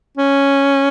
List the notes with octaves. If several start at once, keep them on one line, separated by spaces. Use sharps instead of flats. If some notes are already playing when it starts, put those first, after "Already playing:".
C#4